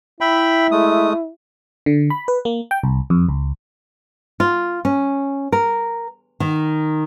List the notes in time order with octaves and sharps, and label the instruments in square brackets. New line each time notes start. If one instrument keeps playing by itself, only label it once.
[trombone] E4 [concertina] E5 G5 B5
[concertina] G#3 A3 D#6
[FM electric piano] D3
B5
B4
A#3
G5
C2
F2
C#2
[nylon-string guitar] F4
C#4
A#4
D#3